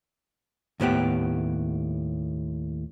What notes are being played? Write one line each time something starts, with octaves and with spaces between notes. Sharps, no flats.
D#2 A2 B3 G4